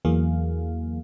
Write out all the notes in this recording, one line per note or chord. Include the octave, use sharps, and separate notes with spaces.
E2 E3 F#3 A#3 G#4 F5